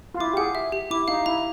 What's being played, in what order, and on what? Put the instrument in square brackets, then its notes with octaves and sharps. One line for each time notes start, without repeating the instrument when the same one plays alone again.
[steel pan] F4
[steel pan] E4 [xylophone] D6
[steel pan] G4
[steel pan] G#4 [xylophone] F#5
[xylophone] E5
G4
[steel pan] E4 [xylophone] D6
[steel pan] D#4 [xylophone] F5
[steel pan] E4 [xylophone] A#5